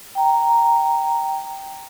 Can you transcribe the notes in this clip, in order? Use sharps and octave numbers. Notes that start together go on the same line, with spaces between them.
G5 A#5